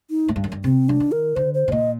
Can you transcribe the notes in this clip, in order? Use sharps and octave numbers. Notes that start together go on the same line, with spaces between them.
D#4
A2
G2
F#2
G2
C3 C4
F#3 D4
D#3
A#4
D3 C5
C5
C3
A#2 D#5